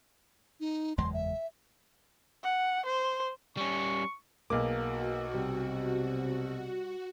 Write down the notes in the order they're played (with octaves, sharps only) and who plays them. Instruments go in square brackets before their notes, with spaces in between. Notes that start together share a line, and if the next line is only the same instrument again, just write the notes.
[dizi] D#4
[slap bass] F#1 E2 G#3 [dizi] C6
[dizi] E5
[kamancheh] F#5
C5
[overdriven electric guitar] G3 C#4 [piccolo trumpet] C#6
[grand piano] B1 D6 [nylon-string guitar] A#3 G#4 [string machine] F#4
[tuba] C3 [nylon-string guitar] G3